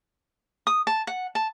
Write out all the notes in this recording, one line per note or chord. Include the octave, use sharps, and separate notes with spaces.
D#6
A5
F#5
A5